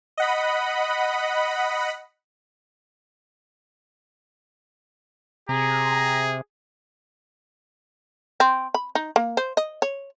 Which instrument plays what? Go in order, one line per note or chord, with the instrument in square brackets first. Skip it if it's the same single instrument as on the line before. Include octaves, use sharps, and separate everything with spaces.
[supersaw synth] D#5 F#5 B5
[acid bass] C3 [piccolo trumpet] G#4 [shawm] A#5
[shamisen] C4
B5
D#4
A#3
C5
D#5
C#5